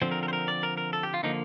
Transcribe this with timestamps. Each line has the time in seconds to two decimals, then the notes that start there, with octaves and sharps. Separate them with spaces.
0.02 D3 F3 C4 C5
0.11 A#4
0.23 A#4
0.28 C5
0.33 A#4
0.48 D5
0.63 A#4
0.77 A#4
0.93 A4
1.03 G4
1.14 F4
1.23 D3 F3 A#3 D#4